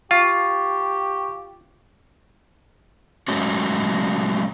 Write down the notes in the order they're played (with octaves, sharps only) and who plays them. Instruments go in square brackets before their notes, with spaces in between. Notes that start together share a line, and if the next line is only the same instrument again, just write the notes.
[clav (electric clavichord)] F4 [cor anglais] G4 [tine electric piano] F5 [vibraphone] C#6
[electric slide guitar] F#3 G#3 A3 C#4 F#4